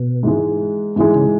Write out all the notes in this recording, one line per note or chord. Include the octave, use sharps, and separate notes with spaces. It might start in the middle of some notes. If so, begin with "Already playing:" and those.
Already playing: B2
G#2 E3 G#3
G#2 E3 G#3
C#3